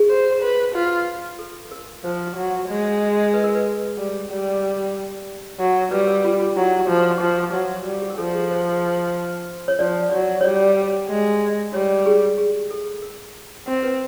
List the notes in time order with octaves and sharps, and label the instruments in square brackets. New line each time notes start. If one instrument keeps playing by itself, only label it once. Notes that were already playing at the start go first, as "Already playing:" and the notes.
Already playing: [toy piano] G#4
[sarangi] C5
B4
F4
[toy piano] A4
A#4
[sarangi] F3 [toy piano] C5
[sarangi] F#3
G#3
[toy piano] B4
A#4
B4
[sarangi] G3
G3
F#3
[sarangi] G3 [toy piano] B4
[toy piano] A#4
F4
F4
[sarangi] F#3 [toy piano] E4
[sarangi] F3
F3
F#3
G3
[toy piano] G4
A#4
[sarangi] F3 [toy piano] A4
[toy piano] G#4
C5
C#5
[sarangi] F3 [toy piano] D5
[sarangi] F#3 [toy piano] D5
[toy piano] C#5
[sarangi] G3 [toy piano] D5
[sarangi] G#3
[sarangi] G3 [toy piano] C#5
[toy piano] G#4
G#4
A4
A#4
[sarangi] C4
[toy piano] B4